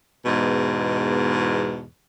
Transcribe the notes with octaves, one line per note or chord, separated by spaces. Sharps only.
E2 G#2 B2